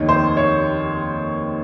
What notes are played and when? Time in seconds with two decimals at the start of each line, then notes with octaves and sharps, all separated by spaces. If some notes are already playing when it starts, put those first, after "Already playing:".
Already playing: F1 D#2 D#3 C#5
0.09 C5
0.37 C#5